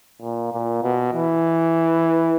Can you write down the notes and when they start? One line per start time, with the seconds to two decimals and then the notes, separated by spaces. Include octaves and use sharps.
0.22 A#2
0.52 A#2
0.83 B2
1.14 E3